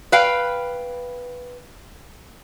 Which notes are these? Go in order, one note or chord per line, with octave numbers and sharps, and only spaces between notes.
B4 F5 G5